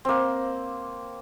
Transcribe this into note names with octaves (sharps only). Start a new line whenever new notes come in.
A#3 C4